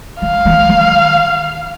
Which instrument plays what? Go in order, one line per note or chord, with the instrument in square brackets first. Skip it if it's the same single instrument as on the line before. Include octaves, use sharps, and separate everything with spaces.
[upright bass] D#3 [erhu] F5
[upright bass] E3
D#3